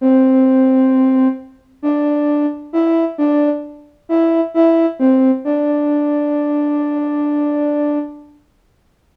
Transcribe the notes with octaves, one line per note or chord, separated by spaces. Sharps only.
C4
D4
E4
D4
E4
E4
C4
D4